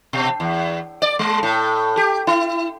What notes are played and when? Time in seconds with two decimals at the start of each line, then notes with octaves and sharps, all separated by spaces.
0.13 B2
0.40 E2
1.02 D5
1.19 G#3
1.43 A2
1.97 G4
2.27 E4